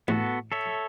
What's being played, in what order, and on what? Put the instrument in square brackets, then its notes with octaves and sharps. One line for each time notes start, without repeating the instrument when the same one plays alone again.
[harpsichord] A1 [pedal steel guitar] B3 F#4 A4
[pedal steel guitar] A4 C#5 E5